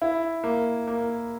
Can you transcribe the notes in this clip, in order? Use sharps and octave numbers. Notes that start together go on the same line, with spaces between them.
E4
A#3
A#3